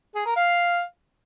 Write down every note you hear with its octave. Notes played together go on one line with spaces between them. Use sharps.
G#4
A#4
F5